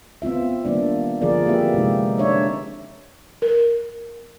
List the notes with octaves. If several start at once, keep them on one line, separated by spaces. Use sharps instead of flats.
B3 C4 F4 E5
D#3 G3 A#3 B3 D4 D5
D3 F3 F4 G#4 A#4 D5
A#3 C4 E4 G4 B4 E5
C3 G#3 D#4
D4 D#4 C#5 D5 E5
A#4